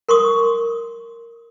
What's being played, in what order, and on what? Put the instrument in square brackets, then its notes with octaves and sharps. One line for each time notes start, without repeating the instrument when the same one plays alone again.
[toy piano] A#4 C6 C#6 D#6